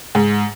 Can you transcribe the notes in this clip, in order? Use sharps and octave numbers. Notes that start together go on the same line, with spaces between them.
G#2